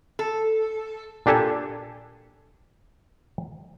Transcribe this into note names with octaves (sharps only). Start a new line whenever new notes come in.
A4
A#2 D4 G4 A4 G#5